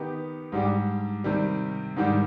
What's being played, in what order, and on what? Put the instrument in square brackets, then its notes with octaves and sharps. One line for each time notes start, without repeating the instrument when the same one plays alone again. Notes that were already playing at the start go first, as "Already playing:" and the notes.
Already playing: [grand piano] D#3 B3 D#4 G4
G#2 G3 D4 G4
C3 D#3 G3
G#2 D#3 G3 D4